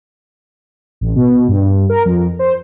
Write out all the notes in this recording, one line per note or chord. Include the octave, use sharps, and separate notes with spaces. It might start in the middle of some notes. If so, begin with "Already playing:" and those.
A1
B2
G2
A#4
F2
C5